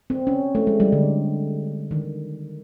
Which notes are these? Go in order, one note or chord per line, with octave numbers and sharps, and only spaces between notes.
C4
C#4
A3
G#3
G3
D3
D#3